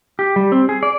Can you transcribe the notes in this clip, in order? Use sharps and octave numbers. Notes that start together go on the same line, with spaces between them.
G4
G3
C4
G#4
D5